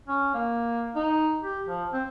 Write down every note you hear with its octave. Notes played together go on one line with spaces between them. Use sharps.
C#4
A#3
D#4
G4
F3
C4